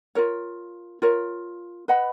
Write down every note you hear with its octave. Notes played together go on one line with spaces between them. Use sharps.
F4 A#4 C#5
F4 A#4 C#5
B4 D#5 F#5 B5